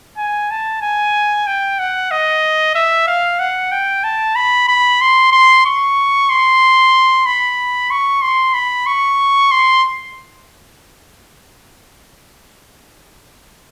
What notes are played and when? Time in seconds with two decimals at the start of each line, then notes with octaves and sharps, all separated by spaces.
0.18 G#5
0.51 A5
0.82 G#5
1.47 G5
1.79 F#5
2.11 D#5
2.75 E5
3.07 F5
3.39 F#5
3.72 G5
4.04 A5
4.36 B5
4.68 B5
5.01 C6
5.32 C6
5.65 C#6
6.30 C6
7.26 B5
7.91 C#6
8.22 C6
8.54 B5
8.86 C#6
9.51 C6